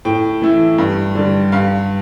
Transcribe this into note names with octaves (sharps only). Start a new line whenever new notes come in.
A2 G5
E3 A3 E4
G2
D3 G3
G2 F5